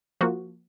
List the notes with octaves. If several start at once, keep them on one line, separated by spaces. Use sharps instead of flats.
F3 A#3 F#4